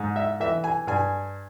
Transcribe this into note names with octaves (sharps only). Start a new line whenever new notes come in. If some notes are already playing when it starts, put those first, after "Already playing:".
Already playing: G#2
E5
E3 E5
G#5
G2 G#5